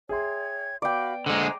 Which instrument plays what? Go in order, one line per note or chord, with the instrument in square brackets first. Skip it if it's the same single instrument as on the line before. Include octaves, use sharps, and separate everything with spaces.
[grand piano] G#4 E5 C6 [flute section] C#5 G5 G#6
[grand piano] B3 [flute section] F#4 F5 B5 [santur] D5 G5
[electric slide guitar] D3 G#3 [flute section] C5 A#5